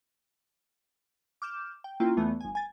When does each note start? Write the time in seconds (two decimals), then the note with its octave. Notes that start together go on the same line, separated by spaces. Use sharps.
1.42 D6 F6 G6 E7
1.84 G5
2.00 A#3 C4 C#4 E4 F4 G5
2.17 E2 E3 A3 B3
2.41 G1 G#5
2.55 G#5 A6